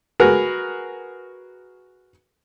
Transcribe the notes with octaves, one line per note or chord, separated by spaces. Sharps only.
F#4 G#4 A#4 B4